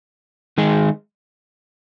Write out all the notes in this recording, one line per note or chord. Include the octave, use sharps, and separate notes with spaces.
D#3 G#3 D#4 G#4